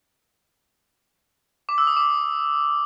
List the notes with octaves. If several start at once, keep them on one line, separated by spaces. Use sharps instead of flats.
D6
E6
D#6
D6